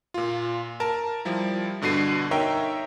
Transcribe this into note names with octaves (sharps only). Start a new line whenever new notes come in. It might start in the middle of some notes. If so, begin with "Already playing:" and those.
A#2 F4
A#4 A5
F3 G3 E4
G2 B2 D3 F#4 C7 D#7
D#4 A#4 C#5 E5 G5